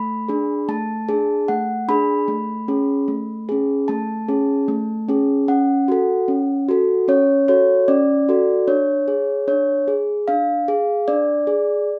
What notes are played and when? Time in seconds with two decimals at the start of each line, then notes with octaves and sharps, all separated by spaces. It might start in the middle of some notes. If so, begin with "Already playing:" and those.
Already playing: A3 B5
0.28 D4 G#4
0.69 A3 A5
1.09 D4 G#4
1.48 A3 F#5
1.89 D4 G#4 B5
2.28 A3
2.68 C#4 G#4
3.08 A3
3.49 C#4 G#4
3.88 A3 A5
4.28 C#4 G#4
4.68 A3
5.09 C#4 G#4
5.48 C#4 F#5
5.88 F#4 A4
6.28 C#4
6.69 F#4 A4
7.08 C#4 C#5
7.48 F#4 A4 C#5
7.88 C#4 D5
8.29 F#4 A4
8.68 D4 C#5
9.08 G#4
9.48 D4 C#5
9.88 G#4
10.28 D4 F5
10.68 G#4
11.08 D4 D5
11.47 G#4